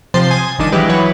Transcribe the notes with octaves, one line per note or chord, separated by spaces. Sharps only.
C3 F3 C5 C6 A6
G#5 D#6
G1 D#3 D4 D#6
E3 F#3 G#3 E4 G4 B4
E3 F#3 B4 C#5